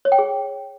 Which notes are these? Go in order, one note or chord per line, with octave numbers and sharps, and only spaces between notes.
C#5
G5
G#4